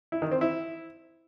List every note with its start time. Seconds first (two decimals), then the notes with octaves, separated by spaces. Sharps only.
0.12 E4
0.22 D#3
0.32 C4
0.41 E4